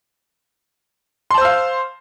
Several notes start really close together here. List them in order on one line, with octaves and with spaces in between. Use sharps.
C6 A5 C5 E6 F5